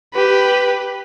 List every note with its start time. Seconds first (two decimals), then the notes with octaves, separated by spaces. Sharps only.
0.14 G4 B4